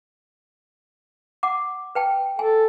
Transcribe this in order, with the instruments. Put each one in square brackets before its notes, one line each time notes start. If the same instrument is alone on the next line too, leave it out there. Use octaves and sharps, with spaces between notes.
[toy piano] F#5 D6
B4 G5 A5
[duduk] A4 [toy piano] G#5